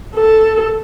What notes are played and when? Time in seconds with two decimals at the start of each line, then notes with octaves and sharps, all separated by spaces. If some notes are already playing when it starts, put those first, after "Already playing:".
0.15 A4